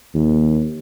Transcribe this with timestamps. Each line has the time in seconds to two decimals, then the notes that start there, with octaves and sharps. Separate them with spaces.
0.14 D#2